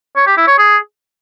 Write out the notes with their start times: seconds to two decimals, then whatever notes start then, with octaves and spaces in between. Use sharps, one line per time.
0.16 C#5
0.27 G4
0.37 E4
0.48 C#5
0.58 G#4